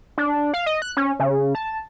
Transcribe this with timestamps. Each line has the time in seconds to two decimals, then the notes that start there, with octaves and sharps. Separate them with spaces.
0.18 D4
0.54 F5
0.66 D#5
0.82 F#6
0.97 C#4
1.20 C#3
1.55 A5